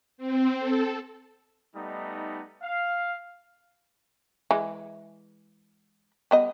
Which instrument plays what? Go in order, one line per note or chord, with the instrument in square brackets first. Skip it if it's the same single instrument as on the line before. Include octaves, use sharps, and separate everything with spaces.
[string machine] C4
A4
[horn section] G3 A3 B3 D#4
F5
[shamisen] E3 G#3
G3 B3 D#5